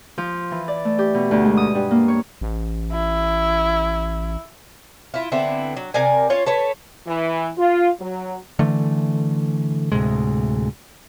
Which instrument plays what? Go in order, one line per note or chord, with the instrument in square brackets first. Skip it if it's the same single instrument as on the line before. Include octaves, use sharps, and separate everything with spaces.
[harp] F3
E3
D5
A3
G4
B2
D2
G#3
D#6
G2
A#3
C#5
[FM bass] A1
[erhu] E4
[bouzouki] E4 F4
D3 B3 C4 E4
F#3
C3 A#4 D5 G#5
C#4 F4 C#5
A4 B4 C#5
[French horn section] E3
F4
F#3
[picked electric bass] D3 E3 A3
D2 A2 C3 G#3